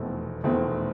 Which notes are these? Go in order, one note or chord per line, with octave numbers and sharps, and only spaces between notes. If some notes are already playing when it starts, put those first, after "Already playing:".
Already playing: F1 E2 B2 A3 C4
F1 E2 B2 A3 C4